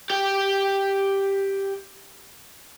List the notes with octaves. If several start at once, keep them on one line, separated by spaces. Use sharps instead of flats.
G4 G5